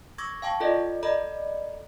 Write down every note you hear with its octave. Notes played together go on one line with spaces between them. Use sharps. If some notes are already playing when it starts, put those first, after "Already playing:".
C#6 D6 E6 G#6 A#6
F5 G5 A5 C#6
F4 A4 D5 D#5
A4 D5 D#5 A#5 B5